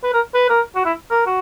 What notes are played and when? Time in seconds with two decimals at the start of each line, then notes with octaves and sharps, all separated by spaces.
0.03 B4
0.13 A#4
0.34 B4
0.49 A#4
0.75 F#4
0.85 E4
1.11 A#4
1.26 F#4